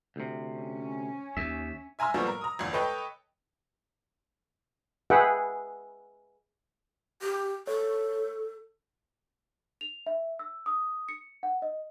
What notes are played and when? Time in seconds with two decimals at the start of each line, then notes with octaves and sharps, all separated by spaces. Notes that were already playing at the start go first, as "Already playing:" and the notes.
0.16 D2 C3
0.54 C#4
1.37 D#2 E5
1.99 E5 G#5 A#5 C6 E6
2.14 A2 F3 G3 A#3 B3
2.27 A#4
2.41 A#5 D#6
2.59 G1 E2
2.73 A4 B4 C#5 D#5 G5
5.10 G#4 B4 E5 F#5 G5
7.21 G4
7.67 A4 C#5
9.81 F7
10.06 E5
10.39 E6
10.66 D#6
11.09 C#7
11.43 F#5
11.62 D#5